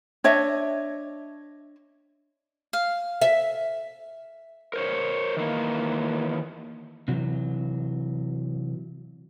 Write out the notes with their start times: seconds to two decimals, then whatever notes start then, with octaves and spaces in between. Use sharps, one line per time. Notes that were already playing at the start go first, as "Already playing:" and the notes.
0.24 D4 C#5 D#5 E5
2.73 F5
3.21 E5
4.74 A#4 C5 C#5
5.37 D#3 E3 A#3
7.08 C3 E3 F#3